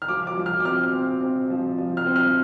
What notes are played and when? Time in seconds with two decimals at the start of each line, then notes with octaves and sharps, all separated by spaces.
0.02 F6
0.08 F3 D6
0.27 D6
0.37 F3
0.46 F6
0.60 D6
0.65 C4 F6
0.93 C4
1.21 C4
1.50 F3
1.78 F3
1.97 F6
2.06 C4
2.16 F6